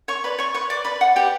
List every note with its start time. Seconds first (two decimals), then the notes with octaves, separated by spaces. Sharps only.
0.08 C#5 C#6
0.24 B4 D5 B5
0.38 C#5 C#6
0.54 B4 C#5 C#6
0.70 D5 D6
0.84 B4 D5 B5
1.01 F#5
1.16 G4 B4 G5